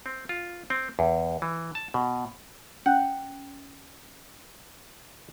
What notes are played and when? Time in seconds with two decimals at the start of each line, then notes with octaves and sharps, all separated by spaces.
0.06 C4
0.29 F4
0.70 C4
0.99 E2
1.42 E3
1.75 A5
1.94 B2
2.86 C#4 F#5